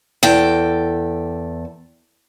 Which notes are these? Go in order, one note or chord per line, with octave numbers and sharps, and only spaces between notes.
E2 A4 G5